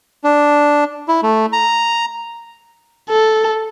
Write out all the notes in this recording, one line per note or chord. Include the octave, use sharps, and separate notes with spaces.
D4
E4
A3
A#5
A4